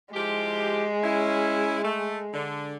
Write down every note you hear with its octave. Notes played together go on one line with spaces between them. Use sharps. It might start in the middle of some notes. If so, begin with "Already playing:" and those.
F3 G#3 E4 G4
C#4 E4
A3
D3